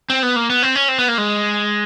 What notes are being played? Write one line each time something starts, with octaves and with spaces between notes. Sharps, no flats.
C4
B3
A#3
B3
C4
C#4
C4
B3
A#3
G#3